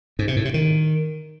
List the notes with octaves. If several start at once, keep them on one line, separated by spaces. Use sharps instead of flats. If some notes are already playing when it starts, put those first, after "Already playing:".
G#2
C3
A2
C3
D#3